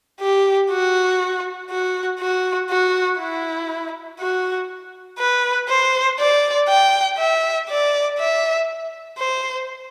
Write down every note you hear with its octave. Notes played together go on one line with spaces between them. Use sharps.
G4
F#4
F#4
F#4
F#4
E4
F#4
B4
C5
D5
G5
E5
D5
E5
C5